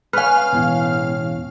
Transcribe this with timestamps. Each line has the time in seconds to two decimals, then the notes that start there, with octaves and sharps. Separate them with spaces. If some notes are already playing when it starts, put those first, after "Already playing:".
0.13 C#4 B4 F5 F6
0.53 E1 E2 A2